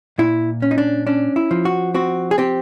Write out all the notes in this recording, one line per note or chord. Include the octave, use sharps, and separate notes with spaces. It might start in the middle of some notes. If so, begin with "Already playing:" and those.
A#2 E4
C#4
D#4
D4
C#4 D4
E4
F3
F#4
C4 F#4
G#4
C4 G4